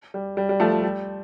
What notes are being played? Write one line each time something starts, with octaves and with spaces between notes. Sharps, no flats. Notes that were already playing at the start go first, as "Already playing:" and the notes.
G3
G3
G3
F3 A3
G3
G3